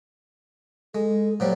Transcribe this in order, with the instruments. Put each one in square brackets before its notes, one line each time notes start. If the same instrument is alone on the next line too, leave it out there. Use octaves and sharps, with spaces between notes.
[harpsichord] G#3 [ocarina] A4
[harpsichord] A#2 F#3 G3 [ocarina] C5